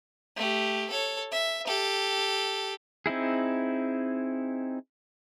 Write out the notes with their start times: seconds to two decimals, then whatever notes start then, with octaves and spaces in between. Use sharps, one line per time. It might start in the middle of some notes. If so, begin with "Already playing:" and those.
0.37 A3 G4
0.90 A4 C#5
1.32 E5
1.66 G4 A4
3.06 C4 D#4 E4 G#4